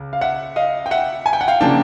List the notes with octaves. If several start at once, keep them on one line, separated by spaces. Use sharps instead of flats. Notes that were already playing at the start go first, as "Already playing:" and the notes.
Already playing: C#2
F5
E5 F#5
D#5 F5
G5
E5 F#5
G#5
G5
F#5
F5 G5
C#3 F3 A#3 D4 G5 A5